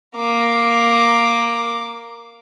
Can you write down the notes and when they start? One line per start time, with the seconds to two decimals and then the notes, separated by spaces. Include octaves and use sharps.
0.16 A#3 D6